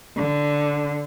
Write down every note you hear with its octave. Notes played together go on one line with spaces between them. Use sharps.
D3